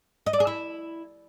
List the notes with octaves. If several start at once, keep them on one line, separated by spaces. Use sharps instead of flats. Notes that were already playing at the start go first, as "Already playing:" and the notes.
D#5
D5
G#4
E4